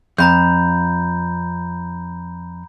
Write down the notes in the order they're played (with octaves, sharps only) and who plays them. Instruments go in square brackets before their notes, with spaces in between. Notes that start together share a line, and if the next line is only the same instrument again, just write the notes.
[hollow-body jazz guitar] F2 [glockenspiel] A#5 B5 G6